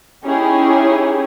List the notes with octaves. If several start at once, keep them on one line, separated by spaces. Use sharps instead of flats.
C#4 D#4 E4 G4 G#4